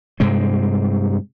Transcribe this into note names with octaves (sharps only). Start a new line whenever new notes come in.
G2 C3 G#3 C4